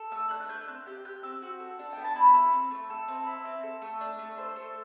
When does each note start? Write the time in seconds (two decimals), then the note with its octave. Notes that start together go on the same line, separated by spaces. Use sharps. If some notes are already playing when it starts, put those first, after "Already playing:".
Already playing: A4
0.12 A3 E6
0.30 D4 F#6
0.40 F#6
0.49 A3 G6
0.68 C4 F#6
0.86 G4 G6
1.05 G4 F#6
1.23 C4 E6
1.42 F#4
1.60 A4
1.79 D4
1.93 B3 G5
2.04 A5
2.16 E4 B5
2.34 A4
2.52 C4
2.71 A3
2.90 A4
3.08 C4
3.27 E4
3.45 C4
3.63 A4
3.82 A3
4.01 D4
4.18 A3
4.38 A4 C5
4.56 A3